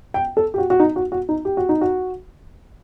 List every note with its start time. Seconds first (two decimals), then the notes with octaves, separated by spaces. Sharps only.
0.14 G5
0.37 A4
0.54 G4
0.58 F#4
0.70 F#4
0.80 D#4
0.96 F#4
1.12 F#4
1.29 D#4
1.45 G4
1.57 F#4
1.69 D#4
1.81 F#4